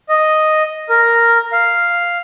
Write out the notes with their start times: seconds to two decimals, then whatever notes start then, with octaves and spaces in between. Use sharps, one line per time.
0.09 D#5
0.89 A#4
1.52 F5